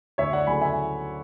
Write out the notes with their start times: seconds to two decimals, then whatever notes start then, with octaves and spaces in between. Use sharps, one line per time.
0.18 D2 C#5 E5
0.33 D5 F#5
0.47 C#3 F#3 A3 G#5 B5
0.61 E5 G#5